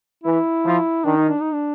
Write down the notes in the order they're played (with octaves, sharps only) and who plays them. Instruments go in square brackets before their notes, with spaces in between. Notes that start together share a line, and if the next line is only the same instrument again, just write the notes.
[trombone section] E3 [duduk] E4
[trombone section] F3
[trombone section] D#3 [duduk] D4
[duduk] D#4
D4
D#4
D4